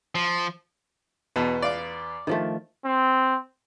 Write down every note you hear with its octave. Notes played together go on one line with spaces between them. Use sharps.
F3
E2 B2 B4 A5
D5 F5 D6
D#3 F3 A3
C4